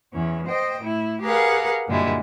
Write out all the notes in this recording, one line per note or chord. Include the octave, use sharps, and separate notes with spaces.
E2 E3 C#4
C5 D#5 G5
A2 E4
G4 G#4 A#4 B4 F5 F#5
F#2 A#2 D3 G3 G#3 E4